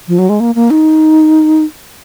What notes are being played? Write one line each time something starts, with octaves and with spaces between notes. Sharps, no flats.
F3
F#3
G#3
A#3
A#3
D#4